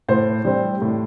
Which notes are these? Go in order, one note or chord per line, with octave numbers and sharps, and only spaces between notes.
A2 C5
G3 C4
A2